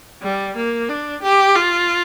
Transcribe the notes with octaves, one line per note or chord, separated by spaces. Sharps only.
G3
A#3
D4
G4
F4